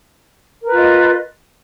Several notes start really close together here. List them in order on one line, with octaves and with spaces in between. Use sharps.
A#4 B4 F4 D#5